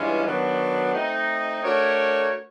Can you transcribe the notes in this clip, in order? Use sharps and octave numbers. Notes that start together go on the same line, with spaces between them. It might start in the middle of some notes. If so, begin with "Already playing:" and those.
Already playing: G2 E3 G#3 C#4 F4
D#3 F#3 B3 D4 F#4
A3 C4 D#4
A3 D4 F#4 A#4 C#5